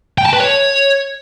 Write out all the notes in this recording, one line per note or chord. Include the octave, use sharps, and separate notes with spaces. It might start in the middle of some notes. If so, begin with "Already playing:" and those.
G5
A5
B4
C#5